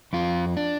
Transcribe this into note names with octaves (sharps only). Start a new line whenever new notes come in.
F2 F4
D4